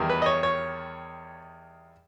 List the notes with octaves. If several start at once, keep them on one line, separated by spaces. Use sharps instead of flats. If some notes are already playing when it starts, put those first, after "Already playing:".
Already playing: E2 D#3 G3
B4
D#5
C#5
C#5